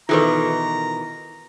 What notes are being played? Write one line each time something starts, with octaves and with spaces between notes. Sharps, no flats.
B2 D#3 E3 F4 A4 B4 A#5